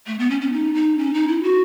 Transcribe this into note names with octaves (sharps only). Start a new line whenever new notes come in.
A3
B3
C#4
C#4
D#4
D#4
C#4
D#4
E4
F#4